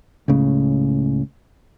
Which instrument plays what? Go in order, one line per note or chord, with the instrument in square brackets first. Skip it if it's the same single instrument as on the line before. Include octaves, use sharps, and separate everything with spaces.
[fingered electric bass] C#2 A2 C#3